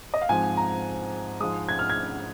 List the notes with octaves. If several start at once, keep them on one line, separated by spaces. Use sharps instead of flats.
D#5
F5
G#2 F3 C4 G#5
A#5
G#2 F3 G#3 D#6
G#6
F6
G#6